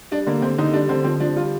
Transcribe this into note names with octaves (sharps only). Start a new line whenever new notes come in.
G3 D4
D3 A#3
D3 C4
D3 D#4
G3 D4
D3 C4
F3 C4
F3 D4
G3 F4